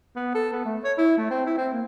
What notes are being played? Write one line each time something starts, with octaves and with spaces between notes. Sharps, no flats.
B3
A4
B3
A3
C#5
E4
A3
C4
E4
C4
A#3